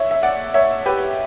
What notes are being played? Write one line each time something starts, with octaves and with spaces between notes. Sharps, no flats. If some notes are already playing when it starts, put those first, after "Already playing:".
Already playing: C#5 E5
E5
D5 F#5
C#5 E5
G4 B4